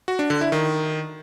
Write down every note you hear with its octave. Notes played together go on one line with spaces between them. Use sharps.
F#4
D4
D3
E4
D#3